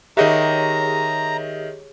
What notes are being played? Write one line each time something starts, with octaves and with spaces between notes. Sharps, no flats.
D#3 G4 G#4 C#5 D#5 E5 A#5